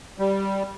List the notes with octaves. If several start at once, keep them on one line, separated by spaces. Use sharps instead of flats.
G3